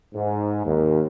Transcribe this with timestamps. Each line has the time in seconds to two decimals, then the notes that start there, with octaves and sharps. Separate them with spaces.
0.14 G#2
0.65 D#2